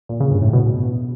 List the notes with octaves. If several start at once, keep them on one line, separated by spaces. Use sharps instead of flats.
A#2
C#3
G2
A2
B2